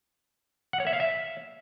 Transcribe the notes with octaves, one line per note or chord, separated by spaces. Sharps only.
F#5
C#5
E5
F5
E5